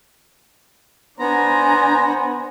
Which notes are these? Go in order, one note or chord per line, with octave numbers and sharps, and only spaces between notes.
B3 D4 C5 G#5 A#5